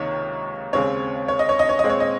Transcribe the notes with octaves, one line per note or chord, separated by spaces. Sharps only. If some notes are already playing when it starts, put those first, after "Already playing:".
Already playing: C#2 C3 D#3 A#3 C#5
D#2 C#3 G#3 C4 C#5
C#5
D#5
C#5
D#5
C#5
A#2 G#3 C4 D#5
C#5
D#5